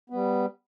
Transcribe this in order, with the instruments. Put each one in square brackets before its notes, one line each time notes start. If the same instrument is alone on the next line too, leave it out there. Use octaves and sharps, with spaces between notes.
[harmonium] G3 B3